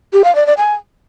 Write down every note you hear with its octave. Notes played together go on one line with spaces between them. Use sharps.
G4
F5
D5
D5
G#5